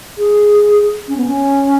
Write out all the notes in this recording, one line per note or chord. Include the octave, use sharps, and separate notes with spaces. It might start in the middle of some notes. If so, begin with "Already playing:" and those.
G#4
C#4
B3
C#4